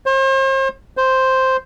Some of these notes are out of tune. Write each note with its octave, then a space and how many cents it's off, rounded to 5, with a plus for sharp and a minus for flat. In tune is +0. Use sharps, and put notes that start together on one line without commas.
C5 +40
C5 +0